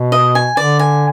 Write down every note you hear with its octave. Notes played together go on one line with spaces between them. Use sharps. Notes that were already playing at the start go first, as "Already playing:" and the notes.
Already playing: B2
D#5
G#5
D3 D5
G#5